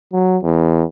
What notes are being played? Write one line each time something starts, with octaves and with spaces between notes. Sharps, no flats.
F#3
E2